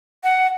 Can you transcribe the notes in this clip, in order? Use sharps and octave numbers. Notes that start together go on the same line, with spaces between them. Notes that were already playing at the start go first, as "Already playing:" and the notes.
F#5